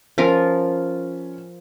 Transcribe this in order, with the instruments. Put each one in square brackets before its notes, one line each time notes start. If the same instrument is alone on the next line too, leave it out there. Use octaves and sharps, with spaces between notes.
[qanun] F3 F4 A#4 [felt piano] C#4